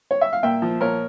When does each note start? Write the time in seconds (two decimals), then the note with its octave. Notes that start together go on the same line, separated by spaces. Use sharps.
0.11 C#5
0.21 E5
0.33 F5
0.43 A#2 E5 G5
0.62 F3
0.81 A#2 A#4 C#5